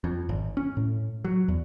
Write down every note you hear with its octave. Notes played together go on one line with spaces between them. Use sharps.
F2
G#1
C#4
A2
F#3
E2